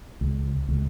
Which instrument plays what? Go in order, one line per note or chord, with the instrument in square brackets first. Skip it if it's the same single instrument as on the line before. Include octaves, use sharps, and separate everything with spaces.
[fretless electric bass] C#2
C#2